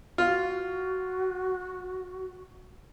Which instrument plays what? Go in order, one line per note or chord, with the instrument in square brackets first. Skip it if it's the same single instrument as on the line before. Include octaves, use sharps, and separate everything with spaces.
[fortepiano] F4 [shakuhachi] F#4